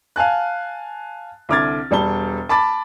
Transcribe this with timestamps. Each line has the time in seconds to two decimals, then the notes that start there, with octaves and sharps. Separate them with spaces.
0.16 F5 G#5 A5 F#6
1.49 C2 D3 D6 F6 G#6 A6
1.91 E1 G3 A5 G7
2.49 A5 B5 D6 A6